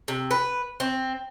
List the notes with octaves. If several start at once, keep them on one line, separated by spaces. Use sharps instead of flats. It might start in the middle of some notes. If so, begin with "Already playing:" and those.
C3
B4
C4